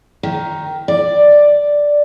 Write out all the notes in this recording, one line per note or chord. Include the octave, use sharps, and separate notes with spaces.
D#3
D5